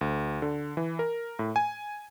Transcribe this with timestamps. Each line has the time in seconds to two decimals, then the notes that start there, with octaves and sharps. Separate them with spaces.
0.01 D2
0.42 D3
0.77 E3
0.99 A#4
1.39 A2
1.56 G#5